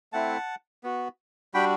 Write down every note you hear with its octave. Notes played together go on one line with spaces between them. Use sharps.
A3 C4 E4 F#5 A5
B3 F#4
G3 D4 F#4 G5 B5